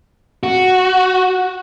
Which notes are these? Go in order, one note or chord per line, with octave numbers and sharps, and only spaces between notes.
F#4